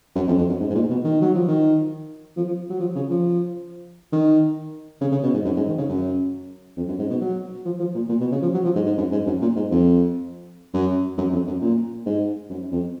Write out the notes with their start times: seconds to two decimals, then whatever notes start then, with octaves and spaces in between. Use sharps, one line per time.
0.16 F#2
0.27 F2
0.38 F2
0.49 F#2
0.60 G#2
0.70 G#2
0.75 A#2
0.89 B2
1.04 D#3
1.22 F#3
1.35 F3
1.48 D#3
2.37 F3
2.48 F3
2.70 F#3
2.80 F3
2.96 C#3
3.10 F3
4.13 D#3
5.01 C#3
5.12 C#3
5.23 B2
5.34 G#2
5.45 F#2
5.56 G#2
5.67 D#3
5.78 C#3
5.89 F#2
6.77 F2
6.88 F#2
6.99 G#2
7.10 B2
7.21 F#3
7.65 F3
7.80 F3
7.95 A#2
8.09 A#2
8.20 B2
8.31 C#3
8.42 F3
8.54 F#3
8.64 F3
8.75 G#2
8.86 G#2
8.97 F#2
9.12 G#2
9.26 F#2
9.41 A#2
9.56 G#2
9.71 F2
10.74 F#2
11.18 F#2
11.32 F2
11.47 F#2
11.62 A#2
12.06 G#2
12.50 F#2
12.72 F2